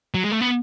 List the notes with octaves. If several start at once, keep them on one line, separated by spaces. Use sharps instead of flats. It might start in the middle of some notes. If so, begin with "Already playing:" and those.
F#3
G#3
A3
B3